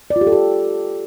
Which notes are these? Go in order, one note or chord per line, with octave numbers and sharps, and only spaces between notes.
D5
F4
G4
A4
G4